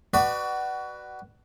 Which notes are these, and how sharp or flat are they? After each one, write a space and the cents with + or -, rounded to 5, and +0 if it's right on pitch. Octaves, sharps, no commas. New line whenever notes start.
F#4 +25 B4 +0 D5 +30